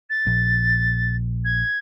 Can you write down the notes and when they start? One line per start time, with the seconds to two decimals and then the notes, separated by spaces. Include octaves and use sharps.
0.09 A6
0.27 A#1
1.44 G#6